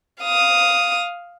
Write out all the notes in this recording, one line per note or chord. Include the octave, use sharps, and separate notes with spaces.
F5 D#6